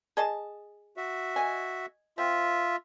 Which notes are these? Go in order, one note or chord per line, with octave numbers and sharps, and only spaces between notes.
G#4 D#5 A5
F#4 E5
D#5 G#5
C4 F4 E5